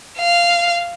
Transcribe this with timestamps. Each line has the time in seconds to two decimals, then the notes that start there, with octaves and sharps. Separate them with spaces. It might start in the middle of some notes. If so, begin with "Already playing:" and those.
0.18 F5